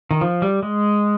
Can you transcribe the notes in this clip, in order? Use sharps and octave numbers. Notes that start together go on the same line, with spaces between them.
D#3
F3
G3
G#3